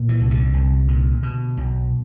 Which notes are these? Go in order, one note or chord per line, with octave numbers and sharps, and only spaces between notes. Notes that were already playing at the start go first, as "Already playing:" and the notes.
Already playing: A#2
E3
C2
D3
C2
A#2
B2
B1